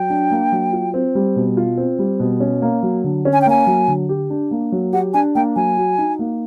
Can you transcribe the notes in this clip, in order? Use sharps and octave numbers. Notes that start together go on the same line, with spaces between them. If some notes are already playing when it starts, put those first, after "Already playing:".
Already playing: F#3 G5
D4
A#3
F#3
F4
C4
G3
B2
F4
C4
G3
B2
C#4
A#3
F#3
D3
C#4
G#5
G5
A#3 G#5
F#3
D3
G4
D4
A#3
F#3
G4 F#5
D4 G#5
A#3 G5
F#3 G#5
F#4
D#4
A#3